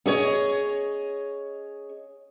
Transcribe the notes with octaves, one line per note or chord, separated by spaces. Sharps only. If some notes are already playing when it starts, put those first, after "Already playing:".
C#4 G#4 C#5 D#5